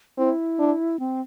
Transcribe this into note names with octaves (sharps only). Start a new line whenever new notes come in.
C4 E4
D4
C4